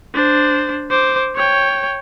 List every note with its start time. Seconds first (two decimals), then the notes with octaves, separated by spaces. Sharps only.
0.14 D4 C5
0.90 C5 D6
1.35 C#5 G5